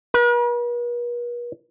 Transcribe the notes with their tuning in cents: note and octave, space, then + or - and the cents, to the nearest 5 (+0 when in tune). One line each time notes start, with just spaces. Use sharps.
B4 -45